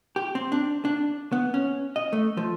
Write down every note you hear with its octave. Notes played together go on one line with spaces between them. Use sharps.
G4
C4
D4
D4
B3
C#4
D#5
A3
F3